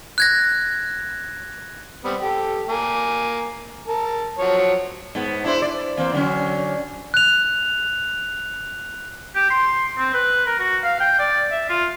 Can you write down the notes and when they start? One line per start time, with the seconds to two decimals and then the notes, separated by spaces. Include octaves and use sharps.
0.18 F#6 G#6 A#6
2.04 G3 B3 C4
2.21 G4 A4
2.68 A#3 G#5
3.88 A#4 A5
4.39 F3 F#3 C#5
5.15 G#2 B3
5.44 D4 E4 C5
5.62 D5
5.97 E3 A#3 C4
6.12 D3 F#3 C#4
7.14 F#6 F7
9.35 G4
9.50 C6
9.98 C4
10.14 B4
10.46 A#4
10.59 F#4
10.83 F5
11.00 G5
11.19 D5
11.51 E5
11.69 F4